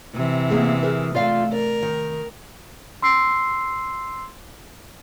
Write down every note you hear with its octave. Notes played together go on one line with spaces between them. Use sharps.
C3 E3
A#3 B3 G#4
G#4 A#4 B4
A3 F4 D5 F5
A#4 D5
D#3
C6 E6 C7